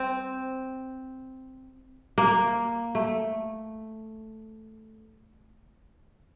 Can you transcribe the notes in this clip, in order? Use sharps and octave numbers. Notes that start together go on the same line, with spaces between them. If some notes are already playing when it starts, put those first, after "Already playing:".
Already playing: C4
A#3
A3